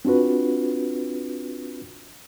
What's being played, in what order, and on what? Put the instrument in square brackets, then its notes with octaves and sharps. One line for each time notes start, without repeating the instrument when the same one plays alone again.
[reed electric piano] C4 D4 F4 F#4 B4